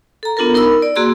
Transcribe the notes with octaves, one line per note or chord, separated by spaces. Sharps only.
A4 A#5
B3 D4 F4 A4 A#4
D#4 A#4 B5 E6
D5
A#3 F#4 G#4 C6 E6